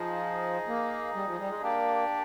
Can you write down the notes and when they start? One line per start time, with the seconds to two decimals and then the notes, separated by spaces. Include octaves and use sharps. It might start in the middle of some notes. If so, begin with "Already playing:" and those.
Already playing: F3 D#4 G#4 D#5
0.68 A#3
1.15 G3
1.26 F3
1.39 G3
1.50 G#3
1.62 A#3 D4 G4 D5